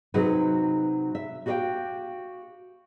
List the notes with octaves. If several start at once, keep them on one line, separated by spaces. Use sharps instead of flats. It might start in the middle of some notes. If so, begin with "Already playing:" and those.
C3 F#3 D#4 F#4 G#4 B4
E5
F#4 G4 A#4 D#5 F5 G5